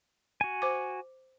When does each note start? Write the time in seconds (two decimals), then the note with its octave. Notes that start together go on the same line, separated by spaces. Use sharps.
0.41 F#4 G#5
0.62 C5 D6